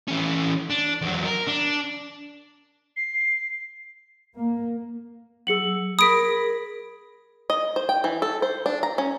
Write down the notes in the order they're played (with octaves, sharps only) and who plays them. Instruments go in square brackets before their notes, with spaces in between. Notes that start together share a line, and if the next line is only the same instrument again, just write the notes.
[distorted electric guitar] E3 C#4
D4
E2 F#3
A#4
D4
[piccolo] C7
[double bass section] A#3
[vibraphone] F#3 E6 [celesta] G#4 C#7 F#7
[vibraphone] G#4 A#4 [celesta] B5 B6 [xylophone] D#6 D7
[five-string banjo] D#5
C5
G5
E3
A4
C5
D4
A#5
C#4